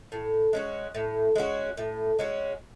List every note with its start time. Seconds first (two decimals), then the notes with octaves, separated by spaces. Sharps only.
0.12 A2
0.53 G#3 C#4 F#4
0.95 A2
1.36 G#3 C#4 F#4
1.77 A2
2.19 G#3 C#4 F#4